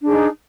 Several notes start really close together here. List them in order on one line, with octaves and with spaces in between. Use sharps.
D4 G#4 D#4